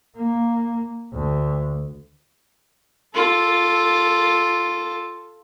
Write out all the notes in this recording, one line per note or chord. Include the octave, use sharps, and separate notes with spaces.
A#3
D2
F4 A4